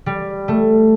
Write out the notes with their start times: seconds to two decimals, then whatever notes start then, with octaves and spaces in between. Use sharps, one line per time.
0.06 G3
0.48 A3